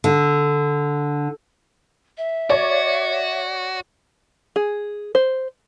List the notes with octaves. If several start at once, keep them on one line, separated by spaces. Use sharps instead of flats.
D3
E5
F#4 C#5 D5
G#4
C5